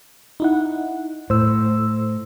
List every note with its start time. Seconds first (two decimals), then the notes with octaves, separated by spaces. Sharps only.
0.40 D#4 E4 F#5
1.30 A2 C5 E6